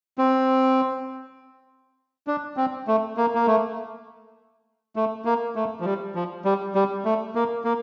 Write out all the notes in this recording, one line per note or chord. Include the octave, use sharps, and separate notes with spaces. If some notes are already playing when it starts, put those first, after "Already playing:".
C4
D4
C4
A3
A#3
A#3
A3
A3
A#3
A3
F3
G3
F3
G3
G3
A3
A#3
A#3